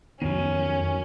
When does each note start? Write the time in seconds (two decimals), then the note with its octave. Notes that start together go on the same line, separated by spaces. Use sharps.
0.22 F2 D#3 F#3 B3 C#4